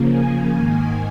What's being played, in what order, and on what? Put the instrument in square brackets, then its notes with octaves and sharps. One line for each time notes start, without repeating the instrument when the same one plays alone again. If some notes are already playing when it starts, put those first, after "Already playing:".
Already playing: [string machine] C#3 F3 A#3
G#5
G#2 D#3 A#3